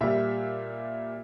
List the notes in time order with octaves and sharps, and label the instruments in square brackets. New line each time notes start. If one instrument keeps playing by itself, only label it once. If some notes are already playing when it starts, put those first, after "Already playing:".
[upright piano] A#2 G3 E5